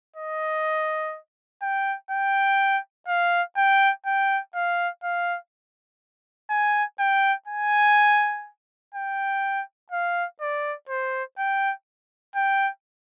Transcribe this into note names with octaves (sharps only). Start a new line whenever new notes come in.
D#5
G5
G5
F5
G5
G5
F5
F5
G#5
G5
G#5
G5
F5
D5
C5
G5
G5